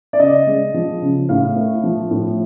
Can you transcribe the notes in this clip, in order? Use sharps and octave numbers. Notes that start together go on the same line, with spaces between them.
D5
C#3 D#5
G#3
F3
C#3
A2 F5
A3
F3
A2